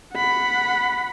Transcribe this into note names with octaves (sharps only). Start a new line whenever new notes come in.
F#5 B5